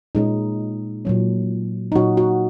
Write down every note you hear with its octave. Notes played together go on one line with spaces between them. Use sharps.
A#2 G#3 C#4 D#4
A#2 F#3 C#4
D#4
A#2 F#3 C#4 F#4
F#4